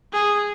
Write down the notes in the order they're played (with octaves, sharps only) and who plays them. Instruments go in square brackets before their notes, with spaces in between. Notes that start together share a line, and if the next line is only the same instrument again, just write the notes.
[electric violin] G#4